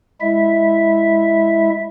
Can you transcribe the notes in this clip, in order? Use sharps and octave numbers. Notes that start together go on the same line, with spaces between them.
G#3 E4 E5